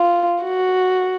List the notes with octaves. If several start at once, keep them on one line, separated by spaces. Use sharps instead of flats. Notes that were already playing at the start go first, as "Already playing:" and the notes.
Already playing: F4
F#4